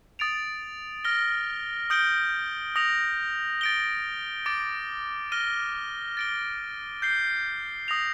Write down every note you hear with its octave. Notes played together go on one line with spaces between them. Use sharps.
D#6 A6 D7 F7
F6 A#6 D7 G7
D#6 G6 D7 G7
D#6 A#6 F7
A6 D7 G7
D6 A6 D7
F6 A#6 D#7 G7
A6 D7 G7
G6 C7 G7
D#6 A#6 F7